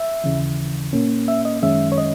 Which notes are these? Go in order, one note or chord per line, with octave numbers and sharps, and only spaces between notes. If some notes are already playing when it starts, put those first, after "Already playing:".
Already playing: E5
D#2 C#3 E3
A#2 A#3 C#4
E5
D#5
F#2 D#3 G#3 C#4 E5
C#5
D#5